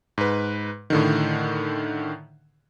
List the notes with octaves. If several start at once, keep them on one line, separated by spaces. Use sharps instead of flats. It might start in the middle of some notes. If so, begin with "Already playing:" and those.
G#2 B4
A2 D3 D#3